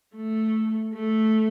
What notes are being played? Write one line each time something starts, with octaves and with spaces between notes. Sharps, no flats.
A3
A3